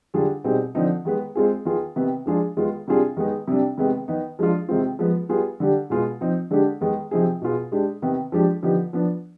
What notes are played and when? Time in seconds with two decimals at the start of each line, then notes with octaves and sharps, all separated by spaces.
0.14 D3 G3 D4 F4 G#4
0.44 B2 G3 C4 D#4 G#4
0.75 D3 F3 C4 D#4
1.05 D#3 G#3 B3
1.35 G#3 C4 F4 G#4
1.65 D#3 B3 F4 G#4
1.96 C3 D#3 B3
2.26 F3 G#3 D4 F4 G#4
2.57 D#3 G#3 B3 F4
2.87 C3 G3 D4 F4 G#4
3.17 D#3 G#3 B3 D#4 G#4
3.47 C3 G3 D4
3.78 C3 D#3 G#3 B3
4.08 D#3 B3 D#4
4.39 F3 G#3 D4 F4
4.69 C3 D#3 G#3 C4 F4
4.99 F3 G#3 B3
5.29 G3 B3 F4 G#4
5.60 D3 G3 D4 G4
5.90 B2 G#3 B3 F4 G#4
6.21 F3 C4 D#4
6.51 D3 G#3 D4 G4
6.81 D#3 G#3 B3
7.11 C3 F3 C4 D#4 G#4
7.42 B2 B3 F4 G#4
7.72 G#3 D4 G4
8.02 C3 D#3 B3
8.32 F3 G#3 D4 G4
8.63 D3 F3 B3 D#4 G4
8.93 F3 B3 D4